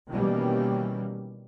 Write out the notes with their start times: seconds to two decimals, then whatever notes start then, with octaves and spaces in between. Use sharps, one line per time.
0.10 B2 D#3 E3 G3 A#3 C#4